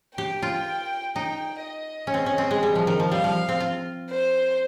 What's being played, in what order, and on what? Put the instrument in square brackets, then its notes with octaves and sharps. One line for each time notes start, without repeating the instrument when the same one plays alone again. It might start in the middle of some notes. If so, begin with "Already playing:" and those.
[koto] G4 [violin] G5
[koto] F4
[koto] D#4 [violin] G5
[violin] D#5
[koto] C#4
C4
C#4
C4
G#3
G3
F3
D#3
F3
[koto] G3 [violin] F5
[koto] F3
C4
F4
[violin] C5